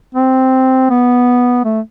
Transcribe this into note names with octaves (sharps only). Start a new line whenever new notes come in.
C4
B3
A3